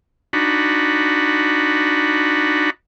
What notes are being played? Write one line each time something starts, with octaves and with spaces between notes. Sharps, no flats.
D4 D#4 F#4 B5